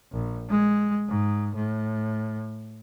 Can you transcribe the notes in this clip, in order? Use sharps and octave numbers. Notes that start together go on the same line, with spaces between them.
A#1
G#3
G#2
A2